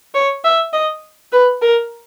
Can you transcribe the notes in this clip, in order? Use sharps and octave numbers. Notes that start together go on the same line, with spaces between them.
C#5
E5
D#5
B4
A#4